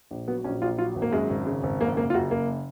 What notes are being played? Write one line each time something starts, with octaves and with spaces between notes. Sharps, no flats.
A#1
F#3 B3
A#1 C#4
A#1 F4
F#3 F4
G#1
A#3
F#2 G#3
G#1
C#3
G#1
F#1 A#3
F#1 A#3
F4
F#1 F#4
F#1 A#3